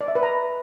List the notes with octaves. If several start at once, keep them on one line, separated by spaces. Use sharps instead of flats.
D5
E5
B4
A#5